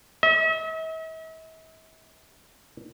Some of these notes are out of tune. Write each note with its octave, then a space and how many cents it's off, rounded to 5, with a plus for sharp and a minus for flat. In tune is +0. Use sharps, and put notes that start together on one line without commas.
E5 -45